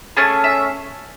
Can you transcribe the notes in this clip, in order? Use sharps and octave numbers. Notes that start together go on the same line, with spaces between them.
A3 C#4 G#4 A5
E5